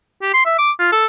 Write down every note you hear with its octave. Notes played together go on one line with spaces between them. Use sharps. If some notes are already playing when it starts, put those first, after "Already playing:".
G4
C6
E5
D6
F4
A4